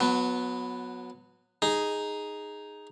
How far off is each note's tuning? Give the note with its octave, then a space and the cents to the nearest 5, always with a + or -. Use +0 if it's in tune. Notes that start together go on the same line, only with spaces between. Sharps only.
F#3 -25 B3 +0
D#4 +0 G#4 +0